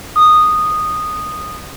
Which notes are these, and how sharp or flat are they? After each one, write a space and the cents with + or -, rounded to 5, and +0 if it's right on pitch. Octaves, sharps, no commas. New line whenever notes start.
D#6 -10